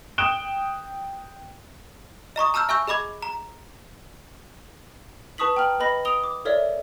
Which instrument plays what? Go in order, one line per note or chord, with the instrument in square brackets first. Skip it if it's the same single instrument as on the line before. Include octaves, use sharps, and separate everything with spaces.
[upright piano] G5 D#6 F#6 D7 E7 G7
[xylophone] D#5 A#5 C#6 D#6
A5 A#5 E6 F6 G6
E5 G#5 C#6 E6 G6
G#4 D#5 B5 D6 G#6
A#5
B4 A5 C#6 D#6 B6 F#7
G5 A#5 F6 F#7
B4 D#5 B5 A#6
D#6 D7 F7 G7
D6
A4 A#4 C#5 D5 E5